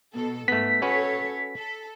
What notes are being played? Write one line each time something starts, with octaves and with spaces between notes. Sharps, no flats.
B2 A4
G#2 A3 B3 B6
C#4 F#4 A4 B4 C#5
A4